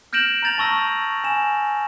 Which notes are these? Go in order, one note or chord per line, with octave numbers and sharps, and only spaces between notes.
F6 G6 A#6 D7 E7 F#7
A#5 G6 A6 F7
A5 C#6 E6 A#6
G#5 E7